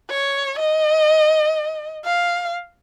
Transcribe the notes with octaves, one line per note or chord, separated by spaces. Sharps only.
C#5
D#5
F5